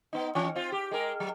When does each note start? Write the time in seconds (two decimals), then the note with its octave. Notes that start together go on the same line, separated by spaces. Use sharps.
0.13 B3 D#4
0.35 E3 C#4
0.55 C4 F4
0.72 G4
0.91 G#3 A#4
1.20 F#3